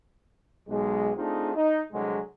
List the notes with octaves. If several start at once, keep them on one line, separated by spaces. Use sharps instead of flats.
B1 G#3
A3 C4 D4 D#4 F4 G#4
D#4
C2 D3 F#3 G#3